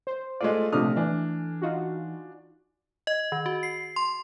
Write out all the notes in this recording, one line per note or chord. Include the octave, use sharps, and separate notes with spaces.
C5
G#3 A3 F4 D5
A#1 C3 F3 A3 D4 D#6 F6
E3 D4 G#5
D#4 F4 F#4
D#5
D#3
F#4
C7
C6